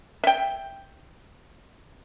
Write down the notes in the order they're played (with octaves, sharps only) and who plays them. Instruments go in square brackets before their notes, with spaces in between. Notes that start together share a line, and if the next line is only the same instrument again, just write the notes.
[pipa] E5 G5